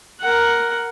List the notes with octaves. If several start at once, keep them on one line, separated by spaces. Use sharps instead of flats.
A#4 F#5